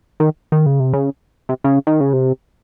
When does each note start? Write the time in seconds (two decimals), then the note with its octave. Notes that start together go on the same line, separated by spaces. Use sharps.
0.20 D#3
0.52 D#3
0.66 C#3
0.80 C3
0.93 C#3
1.49 C3
1.64 C#3
1.87 D#3
2.00 C#3
2.13 C3